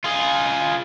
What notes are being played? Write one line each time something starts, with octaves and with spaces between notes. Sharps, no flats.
F4 G#4